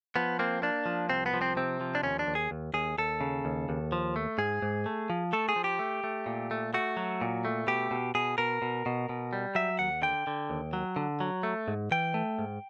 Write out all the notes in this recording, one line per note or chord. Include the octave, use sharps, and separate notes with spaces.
F3 B3
A#3 C4
A#3 D4
F3
C2 C4
B3
F3
C4
C3 C4
F3
D4
D#2 C#4
D4
D#2
G#4
D#2
D#2 G#4
D#2 A4
C#3
D#2
D#2
F3
A3
G#2 G#4
G#2
A3
F3
A3 A4
G#4
F3
G4
A3
A3
A#2
A3
A3 F#4
F#3
A#2
A3
B2 G4
B2
B2 G#4
B2 A#4
B2
B2
B2
G3
F#3 E5
D#2 F#5
D3 G5
D3
D#2
F#3
D3
F#3
A3
G#2
E3 G5
A3
G#2